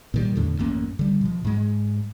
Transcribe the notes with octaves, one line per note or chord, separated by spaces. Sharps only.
A#2 D#3 G3
E2 A2 D3
A1 F#2 A#3 C#4
D3 G3
B2 F3
G#2 G#3